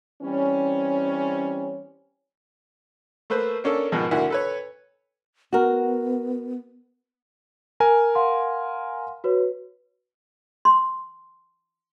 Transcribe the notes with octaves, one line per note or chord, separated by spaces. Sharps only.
E3 G3 C4 C#4
A3 A#3 B4 C5
A#3 C#4 D4 A4
G#2 B2 D#3 F3 G#3
D2 A#3 E4 F#4
A4 B4 C#5
B3 F#4 A#4
A#4 G#5
F5 F#5 C6
F#4 B4 C#5
C6